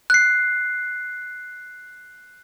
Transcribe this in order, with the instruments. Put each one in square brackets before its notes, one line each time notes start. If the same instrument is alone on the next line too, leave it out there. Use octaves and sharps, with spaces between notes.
[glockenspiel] F#6 C7